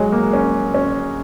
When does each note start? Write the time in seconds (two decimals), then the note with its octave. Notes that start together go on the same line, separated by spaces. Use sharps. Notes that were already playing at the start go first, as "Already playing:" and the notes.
Already playing: F#3 G#3
0.12 A#3
0.33 C#4
0.74 C#4